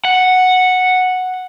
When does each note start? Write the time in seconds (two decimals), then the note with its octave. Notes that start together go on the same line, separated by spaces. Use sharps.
0.05 F#5